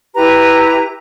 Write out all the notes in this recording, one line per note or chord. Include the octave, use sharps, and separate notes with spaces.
E4 G4 B4 A#5